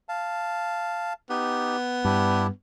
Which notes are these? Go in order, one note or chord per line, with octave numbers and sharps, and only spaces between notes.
F5 A5
B3 D#4 G4
G2 D4 E4 G4